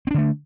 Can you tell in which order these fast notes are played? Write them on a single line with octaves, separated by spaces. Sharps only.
C4 D4 D3 A3